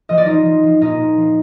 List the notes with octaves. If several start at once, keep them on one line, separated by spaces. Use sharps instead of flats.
F3 D#5
D5
F3 D#4 D#5
F3
F3
A#2 D#4 D#5
A#2
F3